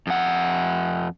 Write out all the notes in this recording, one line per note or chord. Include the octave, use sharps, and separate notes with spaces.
F2 F#5